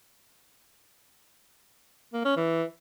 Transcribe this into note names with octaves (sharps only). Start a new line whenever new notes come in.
A#3
C#4
E3